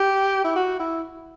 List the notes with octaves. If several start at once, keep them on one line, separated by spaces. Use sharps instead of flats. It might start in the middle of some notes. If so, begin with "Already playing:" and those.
Already playing: G4
E4
F#4
E4